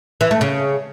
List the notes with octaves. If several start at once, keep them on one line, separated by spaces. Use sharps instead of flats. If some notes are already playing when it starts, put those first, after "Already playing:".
E3
A3
C#3